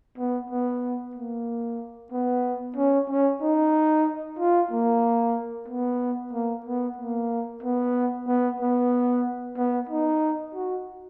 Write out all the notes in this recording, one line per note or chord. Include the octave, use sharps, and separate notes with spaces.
B3
B3
A#3
B3
C#4
C#4
D#4
F4
A#3
B3
A#3
B3
A#3
B3
B3
B3
B3
D#4
F#4